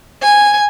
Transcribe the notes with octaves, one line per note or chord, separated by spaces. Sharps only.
G#5